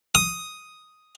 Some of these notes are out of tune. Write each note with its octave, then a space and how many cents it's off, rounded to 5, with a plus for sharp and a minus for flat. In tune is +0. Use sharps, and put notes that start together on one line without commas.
D#6 +5